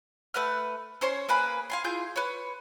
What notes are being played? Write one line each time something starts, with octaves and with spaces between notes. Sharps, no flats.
A3 B4 F#5 F6
C#4 C5 C#5 C6
A#3 G#4 B4 B5
F5 G#5 C6
E4 F4 G#4 G6
B4 C#5